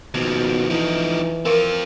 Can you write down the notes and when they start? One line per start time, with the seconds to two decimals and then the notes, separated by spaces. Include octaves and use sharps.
0.14 D#2 B2 F3
0.70 E3 F3 D#4
1.45 C4 F4 A#4 D6